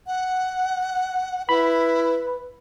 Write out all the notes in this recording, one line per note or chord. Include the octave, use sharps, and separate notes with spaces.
F#5
E4 B4 B5